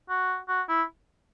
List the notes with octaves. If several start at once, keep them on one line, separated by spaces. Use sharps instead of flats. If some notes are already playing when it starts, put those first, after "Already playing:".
F#4
F#4
E4